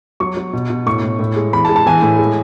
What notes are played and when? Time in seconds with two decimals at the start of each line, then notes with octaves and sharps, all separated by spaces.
0.20 F#3 C#6
0.37 F#3
0.53 B2
0.70 B2
0.86 A2 C#6
1.03 A2
1.19 A2
1.36 G#3
1.53 E3 B5
1.65 A5
1.69 G#3
1.76 A5
1.86 E3 G#5
2.02 A2
2.19 G#3